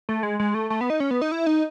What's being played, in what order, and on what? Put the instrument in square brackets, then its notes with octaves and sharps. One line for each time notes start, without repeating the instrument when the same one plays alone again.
[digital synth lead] A3
G#3
G#3
A3
A3
B3
D#4
C#4
B3
D#4
E4
D#4